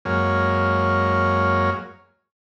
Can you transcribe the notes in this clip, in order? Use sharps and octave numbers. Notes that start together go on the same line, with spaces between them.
F#2 F#3 G#3 A#3 C#5 F6